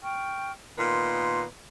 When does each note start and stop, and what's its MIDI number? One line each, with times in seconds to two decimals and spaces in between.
0.02 0.50 79
0.02 0.50 85
0.02 0.50 89
0.78 1.44 46
0.78 1.44 51
0.78 1.44 59
0.78 1.38 84